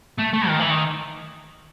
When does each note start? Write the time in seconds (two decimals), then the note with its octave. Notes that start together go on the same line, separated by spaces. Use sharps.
0.18 A3
0.33 A3
0.48 D#3
0.60 E3
0.71 D#3